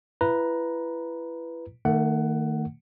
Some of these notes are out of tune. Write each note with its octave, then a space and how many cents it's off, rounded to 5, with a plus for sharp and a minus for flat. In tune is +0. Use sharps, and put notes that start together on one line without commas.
E4 +30 B4 +0 A#5 +5
D#3 +5 A3 +45 F#5 +15